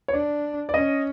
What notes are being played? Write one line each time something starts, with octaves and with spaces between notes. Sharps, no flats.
C#5
D4 D5
D5
C#4 D#5